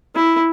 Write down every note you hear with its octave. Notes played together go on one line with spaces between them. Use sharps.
E4